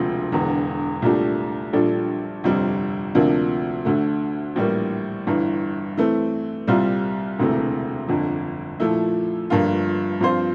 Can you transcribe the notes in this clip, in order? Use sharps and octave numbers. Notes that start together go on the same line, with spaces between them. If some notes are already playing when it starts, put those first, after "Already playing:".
Already playing: E1 D2 C3 F3 C4
E1 E2 D3
C2 A#2 A3 D4 G4
A#1 A#2 G3 D4 A4
G1 F2 C3 G3 C4
D2 C3 F3 A#3 D4
D2 D3 A3
A#1 A2 E3 G3 A#3
G1 G2 E3
E3 A3 C4
C2 A#2 G3 C4 F4
E1 D2 C3 E3 A3
G1 F2 D3
A#2 F3 A3 E4
G1 G2 F3 A#3 F4
G2 F3 C4 F4 C5